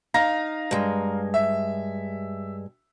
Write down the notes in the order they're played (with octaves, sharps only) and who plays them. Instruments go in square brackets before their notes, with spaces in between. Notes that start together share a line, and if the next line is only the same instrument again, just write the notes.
[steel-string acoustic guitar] D#4 [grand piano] F5 A#5 A#6
[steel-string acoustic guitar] G2 G#3
[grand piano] E5